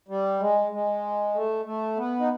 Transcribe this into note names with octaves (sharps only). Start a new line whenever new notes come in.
G3
G#3
G#3
A3
A3
B3
D#4